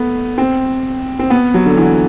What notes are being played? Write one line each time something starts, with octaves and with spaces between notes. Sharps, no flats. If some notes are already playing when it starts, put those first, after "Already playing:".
Already playing: A3 B3
C4
C4
B3
F#3
D3
E3